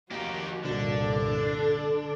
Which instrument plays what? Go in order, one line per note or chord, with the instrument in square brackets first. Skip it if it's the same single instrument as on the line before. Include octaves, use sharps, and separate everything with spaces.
[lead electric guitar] F2 G4 [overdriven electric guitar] A#3 D#4 [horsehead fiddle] F#4
[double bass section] C2 G2 A#2 [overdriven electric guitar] D3 [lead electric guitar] D4
[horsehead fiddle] A4